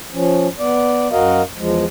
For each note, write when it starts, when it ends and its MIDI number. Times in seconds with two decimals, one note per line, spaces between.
0.13 0.48 53
0.13 0.48 61
0.59 1.08 59
0.59 1.08 74
1.12 1.42 42
1.12 1.42 66
1.12 1.42 70
1.12 1.42 75
1.12 1.42 77
1.57 1.85 40
1.57 1.85 53
1.57 1.85 56